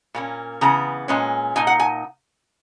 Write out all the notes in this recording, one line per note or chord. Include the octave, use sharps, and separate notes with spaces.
A#2 A#3 C#4
C#3 E3 B3 A#5
A#2 G#3 C#4
A#2 A#3 D#4 G#5
F#5
G#5